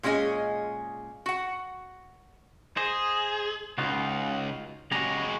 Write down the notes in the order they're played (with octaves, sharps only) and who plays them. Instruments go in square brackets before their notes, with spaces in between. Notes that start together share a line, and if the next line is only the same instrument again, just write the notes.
[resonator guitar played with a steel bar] A#2 G#3 C#4 G#4 D#5 G#5
F#4 F#5
[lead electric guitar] G#4 [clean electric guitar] C5 D#5
[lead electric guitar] C#2 [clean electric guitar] D#4 F4 F#4
[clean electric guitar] C#3 G4 A#5 [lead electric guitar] G#3 F#4